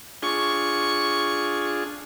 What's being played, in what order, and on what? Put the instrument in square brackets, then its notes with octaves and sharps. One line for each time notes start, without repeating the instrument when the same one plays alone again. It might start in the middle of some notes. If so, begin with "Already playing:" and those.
[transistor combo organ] D4 F4 G#4 [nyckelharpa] C#6